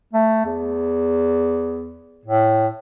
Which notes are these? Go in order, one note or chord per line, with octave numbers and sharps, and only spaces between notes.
A3
E2
A2